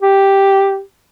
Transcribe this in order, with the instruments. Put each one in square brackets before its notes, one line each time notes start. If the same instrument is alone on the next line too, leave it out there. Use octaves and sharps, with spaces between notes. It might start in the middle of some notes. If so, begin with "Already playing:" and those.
[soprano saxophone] G4